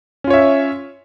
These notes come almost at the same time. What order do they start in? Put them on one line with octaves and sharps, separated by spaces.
C#4 F4 C#5 E5